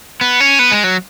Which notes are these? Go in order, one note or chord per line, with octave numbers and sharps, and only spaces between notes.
B3
C#4
B3
G#3
F#3